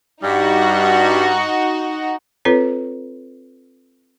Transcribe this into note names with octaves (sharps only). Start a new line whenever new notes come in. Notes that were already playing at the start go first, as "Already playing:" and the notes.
G2 G3 D#4 F#4
C4 F4 A4 B4 C#5